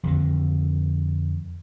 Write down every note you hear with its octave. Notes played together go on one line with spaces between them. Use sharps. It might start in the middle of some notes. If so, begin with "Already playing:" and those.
F2 D3 D#3